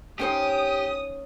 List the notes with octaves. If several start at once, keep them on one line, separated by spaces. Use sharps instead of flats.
C#4 D#4 G4 C5 G5 D#6